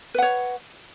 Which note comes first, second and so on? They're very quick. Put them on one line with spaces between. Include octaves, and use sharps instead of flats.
B4 F#5 C#5